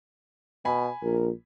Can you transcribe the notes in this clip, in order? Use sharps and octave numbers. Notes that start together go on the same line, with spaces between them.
B2 G#5 B5
A#1 A#4